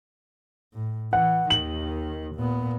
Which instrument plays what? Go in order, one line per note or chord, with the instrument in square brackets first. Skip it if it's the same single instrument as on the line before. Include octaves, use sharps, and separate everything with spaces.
[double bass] A2
[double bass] E3 [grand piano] F#5
[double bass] D#2 D#3 [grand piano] F#7
[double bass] A#2 B3